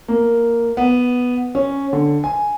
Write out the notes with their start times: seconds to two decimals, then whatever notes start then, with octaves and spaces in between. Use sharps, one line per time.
0.08 A#3
0.77 B3
1.55 C#4
1.93 D3
2.24 G#5